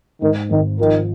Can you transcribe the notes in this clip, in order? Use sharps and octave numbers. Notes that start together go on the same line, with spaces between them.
G#2 D#3
G#1 D#3
D#3 F3